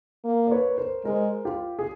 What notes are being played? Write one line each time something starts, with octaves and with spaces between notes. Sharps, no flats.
A#3
D5
B4 C#5
A#4 C5
G#3 A#4 C5
F4 G4
G#4